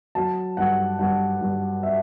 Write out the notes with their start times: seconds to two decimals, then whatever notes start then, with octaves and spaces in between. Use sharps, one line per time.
0.15 F#3 A5
0.57 G2 F#5
0.99 G2 F#5
1.41 G2
1.83 E5